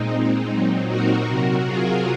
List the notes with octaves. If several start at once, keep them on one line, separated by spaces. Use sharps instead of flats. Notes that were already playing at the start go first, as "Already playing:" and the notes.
Already playing: A#2 G#3 C4 D#4
C4 D#4
A#2 F#3
F#4 A#4
C3 F#3
F4 G#4